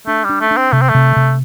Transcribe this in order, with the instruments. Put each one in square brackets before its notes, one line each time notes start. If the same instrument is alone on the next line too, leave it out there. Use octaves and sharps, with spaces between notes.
[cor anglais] A3 [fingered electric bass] D4
[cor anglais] G3
[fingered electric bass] D4
[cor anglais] A3
[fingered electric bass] D4
[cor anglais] C4
[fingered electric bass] C3 [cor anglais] A3
[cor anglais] C4
A3
[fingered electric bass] C3
C3